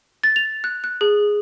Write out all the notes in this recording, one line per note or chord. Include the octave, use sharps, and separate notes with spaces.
A6
F7
F#6
F#6
G#4